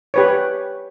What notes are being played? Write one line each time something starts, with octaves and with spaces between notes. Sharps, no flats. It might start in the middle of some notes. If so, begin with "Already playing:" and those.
G4 B4 C#5